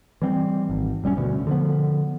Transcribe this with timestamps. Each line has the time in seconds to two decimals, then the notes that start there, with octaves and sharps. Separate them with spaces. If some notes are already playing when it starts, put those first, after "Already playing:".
0.22 E3 G3 C4
0.70 G#1
1.04 E1 G3 C4 C#4
1.17 D2 B2
1.47 D3 F3 B3